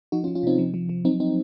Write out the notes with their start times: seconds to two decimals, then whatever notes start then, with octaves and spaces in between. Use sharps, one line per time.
0.12 F3 D#4 F#4
0.24 C#4 F4
0.28 F3
0.35 C#4 F4
0.43 C3 C4 D#4
0.58 F3
0.74 F3
0.89 F3
1.05 F#3 C4 D#4
1.20 C4 D#4